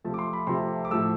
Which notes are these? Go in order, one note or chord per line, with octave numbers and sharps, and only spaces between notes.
C3 F3 A3 A5
D6
C6
B5
C3 F3 A3 C6
D6
A2 F3 A3 E6